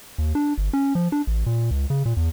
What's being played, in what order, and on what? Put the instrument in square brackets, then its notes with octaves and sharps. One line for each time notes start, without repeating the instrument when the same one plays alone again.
[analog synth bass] D#2
D4
G1
C#4
F3
D4
A1
A#2
C#2
C#3
A#2
E2